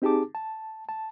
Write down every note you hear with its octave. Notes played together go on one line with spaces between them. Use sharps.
C4 D#4 G4 G#4 A5 D6
A5
A5